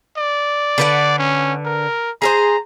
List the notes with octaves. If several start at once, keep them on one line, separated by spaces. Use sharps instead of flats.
D5
D3 B4 F#5
C#4
A#4
G#4 A4 C5 A#5